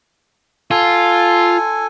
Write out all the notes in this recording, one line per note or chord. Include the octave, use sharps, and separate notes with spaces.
F4 A4 G#5